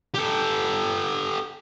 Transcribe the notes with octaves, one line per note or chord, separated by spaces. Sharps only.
G4 A4